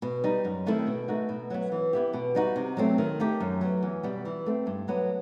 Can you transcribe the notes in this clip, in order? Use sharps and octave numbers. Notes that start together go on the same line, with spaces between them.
B2
G3 D#4
F#2
D#3 A3 C4 E4
B2
A3 D#4 F#4
B2
F#3 B3
E3
B3 E4 G4
B2
G3 D#4 F#4
C3
F#3 A3 C4
D#3
A3 D#4 G4
F#2
F#3 B3
E2
B2 G3 B3
E3
A3 C4
G2
F#3 B3